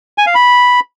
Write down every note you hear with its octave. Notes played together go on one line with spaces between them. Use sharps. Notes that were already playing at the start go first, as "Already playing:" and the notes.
G#5
F5
B5